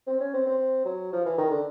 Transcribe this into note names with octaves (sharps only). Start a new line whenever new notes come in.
C4
C#4
C4
C4
F#3
F3
E3
D#3
D3